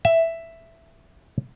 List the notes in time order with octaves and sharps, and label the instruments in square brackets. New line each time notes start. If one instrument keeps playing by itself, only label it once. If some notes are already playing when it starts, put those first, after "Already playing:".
[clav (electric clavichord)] E5